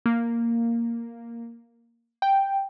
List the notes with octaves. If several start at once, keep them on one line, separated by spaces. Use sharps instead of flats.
A#3
G5